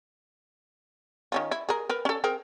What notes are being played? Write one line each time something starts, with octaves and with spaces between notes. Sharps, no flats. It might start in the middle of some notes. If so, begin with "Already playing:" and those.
D#3 C#4 F4
E4
G#4 A#4
A#4 B4
C#4 A4
C4 G#4 A#4